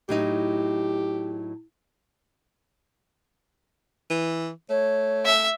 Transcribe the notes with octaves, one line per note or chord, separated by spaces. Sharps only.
A2 F#3 D#4 G4
E3
A3 C#5
E5